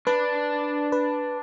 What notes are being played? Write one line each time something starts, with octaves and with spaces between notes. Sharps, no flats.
D4 B4
B4